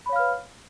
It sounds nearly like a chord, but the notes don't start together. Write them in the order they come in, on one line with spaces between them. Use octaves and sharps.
B5 C#5 F5 F6 B4